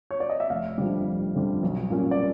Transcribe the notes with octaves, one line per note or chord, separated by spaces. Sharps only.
C#5
D5
D#5
E5
F1 F5
F2 D3 G3
F1
F2 D3 G3
B1
A#2 G3 A#3 C#4
D5